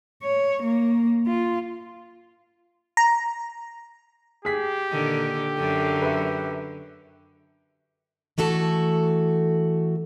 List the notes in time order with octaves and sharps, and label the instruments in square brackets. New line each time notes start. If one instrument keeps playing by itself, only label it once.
[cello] C#5
A#3
F4
[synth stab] A#5
[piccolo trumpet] G4 [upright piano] G#4 B6
[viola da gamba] A#2 D3 D#3
F#2 D3 F#3
[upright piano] B4 E5
[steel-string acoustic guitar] E3 A3 F#4 A4